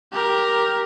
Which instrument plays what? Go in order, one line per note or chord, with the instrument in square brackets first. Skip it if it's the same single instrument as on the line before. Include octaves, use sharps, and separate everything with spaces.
[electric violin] G4 A#4